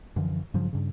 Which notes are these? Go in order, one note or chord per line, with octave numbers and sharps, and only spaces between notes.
F#2 D3 E3 F3
G2 C#3 F3 F#3
G2 C#3